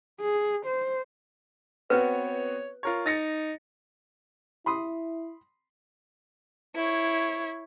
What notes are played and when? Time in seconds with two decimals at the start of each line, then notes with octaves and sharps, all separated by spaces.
0.21 G#4
0.66 C5
1.90 B3 C4 F#4 B4 C#5
2.83 F4 A#4 C#5
3.06 D#4 A6 A#6 C#7
4.66 E4 B5 C6 D#6
6.76 E4 C#5